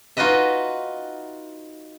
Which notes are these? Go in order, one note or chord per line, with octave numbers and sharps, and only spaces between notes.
D#4 F4 F#4 B4 D#5 E5